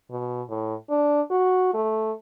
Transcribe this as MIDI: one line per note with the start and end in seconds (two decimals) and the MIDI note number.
0.11 0.42 47
0.49 0.75 45
0.90 1.21 62
1.31 1.73 66
1.74 2.12 57